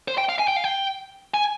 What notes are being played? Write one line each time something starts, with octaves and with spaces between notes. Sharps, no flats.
C5
G5
F5
G#5
G5
F5
G5
G#5